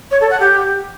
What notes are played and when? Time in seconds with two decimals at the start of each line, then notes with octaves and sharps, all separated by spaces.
0.11 C#5
0.21 A4
0.31 F#5
0.40 G4